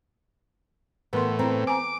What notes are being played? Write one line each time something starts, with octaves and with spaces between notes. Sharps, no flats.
A2 E3 B3 A#4 C6
C4 E4 A#5
G#5 A#5 D6